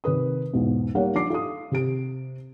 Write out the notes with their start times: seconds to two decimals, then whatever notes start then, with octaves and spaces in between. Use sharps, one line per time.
0.04 C3 D#3 B4 D#6
0.54 B1 E2 G#2
0.95 G3 A#3 D#4 G4 C#5 F#5
1.15 F3 D4 D6 C7
1.30 F4 A4 D#6
1.72 C3 G4 D7